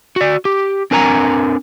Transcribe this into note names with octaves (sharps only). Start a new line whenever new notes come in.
F#4 D5
G4
C4 D4 A#4 G#5 A#5